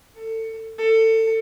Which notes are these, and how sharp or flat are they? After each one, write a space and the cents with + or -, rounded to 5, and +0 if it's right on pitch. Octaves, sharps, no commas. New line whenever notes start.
A4 +25
A4 +25